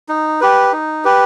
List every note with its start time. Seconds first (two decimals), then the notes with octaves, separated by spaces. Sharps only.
0.09 D#4
0.41 G4 B4
0.73 D#4
1.04 G4 B4